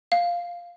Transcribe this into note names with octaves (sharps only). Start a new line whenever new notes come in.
F5